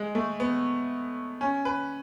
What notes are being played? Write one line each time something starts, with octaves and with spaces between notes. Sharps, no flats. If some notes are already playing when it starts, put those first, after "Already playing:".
Already playing: G#3
A3
B3
C#4
B4